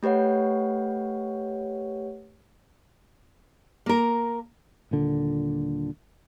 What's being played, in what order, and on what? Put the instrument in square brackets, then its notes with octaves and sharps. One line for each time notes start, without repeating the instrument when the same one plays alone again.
[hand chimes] A3 G4 B4 C#5 F#5
[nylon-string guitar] A#3 A#4
[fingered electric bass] D#1 A#2 D3